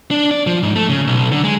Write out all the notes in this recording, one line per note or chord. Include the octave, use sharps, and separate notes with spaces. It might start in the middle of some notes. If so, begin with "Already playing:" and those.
D4
D5
F3
G#2
A3
C#3
B1
D3
G#3